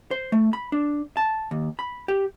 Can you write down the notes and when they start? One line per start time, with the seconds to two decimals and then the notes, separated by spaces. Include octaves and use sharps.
0.11 C5
0.32 A3
0.53 B5
0.72 D4
1.17 A5
1.51 D#2
1.79 B5
2.08 G4